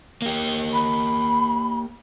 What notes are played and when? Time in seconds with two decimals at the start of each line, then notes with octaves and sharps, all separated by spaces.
0.22 A#3 G4
0.73 B5